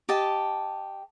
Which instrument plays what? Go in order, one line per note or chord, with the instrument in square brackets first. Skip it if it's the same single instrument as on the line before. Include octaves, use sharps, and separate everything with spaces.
[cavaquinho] G4 D#5 A5